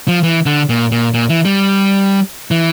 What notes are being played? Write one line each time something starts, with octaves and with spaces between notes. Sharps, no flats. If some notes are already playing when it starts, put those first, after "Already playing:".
F3
E3
D3
A#2
A#2
A#2
E3
G3
E3